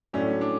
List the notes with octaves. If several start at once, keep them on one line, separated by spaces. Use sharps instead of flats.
A2 F#3 A3 C#4 D4
D4